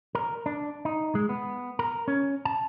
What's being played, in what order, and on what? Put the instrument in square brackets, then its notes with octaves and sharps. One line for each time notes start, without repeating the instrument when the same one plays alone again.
[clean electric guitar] A#4
D4
D#4
G#3
B3
A#4
C#4
A5